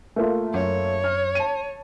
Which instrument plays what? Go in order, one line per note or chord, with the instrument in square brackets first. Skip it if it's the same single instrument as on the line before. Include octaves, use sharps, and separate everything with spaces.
[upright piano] A3 A#3 F4
[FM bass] F#2 [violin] C#5
[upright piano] F6
A5 D#7